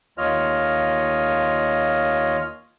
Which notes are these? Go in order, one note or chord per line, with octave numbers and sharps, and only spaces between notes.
D#2 F4 C#5 D#5 F6